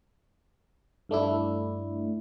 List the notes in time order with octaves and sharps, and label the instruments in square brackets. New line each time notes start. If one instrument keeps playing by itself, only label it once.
[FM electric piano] G2 A3 D4 E4